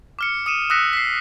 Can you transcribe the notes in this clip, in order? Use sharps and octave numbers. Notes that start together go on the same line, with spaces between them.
D6 F6 C#7
D#6 C#7 D#7 E7
D#6 E6 F#6 A#6 B6 C#7
B6 C7